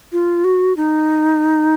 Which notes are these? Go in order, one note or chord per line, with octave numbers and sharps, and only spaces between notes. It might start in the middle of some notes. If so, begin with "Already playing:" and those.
F4
F#4
D#4